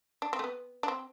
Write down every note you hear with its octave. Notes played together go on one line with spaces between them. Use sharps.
D4
C4
A3
B3
D4
C4